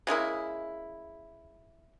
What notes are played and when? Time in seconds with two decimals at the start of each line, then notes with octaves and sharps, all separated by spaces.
0.07 C#3 G#3 A#3 E4